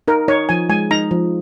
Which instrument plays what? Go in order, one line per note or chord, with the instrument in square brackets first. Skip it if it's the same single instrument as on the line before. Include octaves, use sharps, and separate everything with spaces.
[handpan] D#4 [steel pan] A#4
[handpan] D#4 [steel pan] C#5
[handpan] F3 [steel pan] G#5
[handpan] G#3 [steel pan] G#5
[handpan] D#4 [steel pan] A#5
[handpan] F3